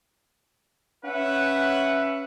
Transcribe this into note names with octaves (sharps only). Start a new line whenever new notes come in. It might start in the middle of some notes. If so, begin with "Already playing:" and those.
C#4 B4 E5 F#5